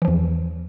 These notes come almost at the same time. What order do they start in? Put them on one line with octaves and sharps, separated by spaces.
E3 F3 E2